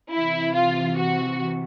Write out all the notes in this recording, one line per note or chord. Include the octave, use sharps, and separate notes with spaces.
C3 E3 E4
F4
F#4